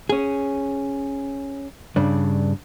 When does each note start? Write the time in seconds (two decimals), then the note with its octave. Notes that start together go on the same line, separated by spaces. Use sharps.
0.09 C#4 G#4
1.96 G2 C#3 D4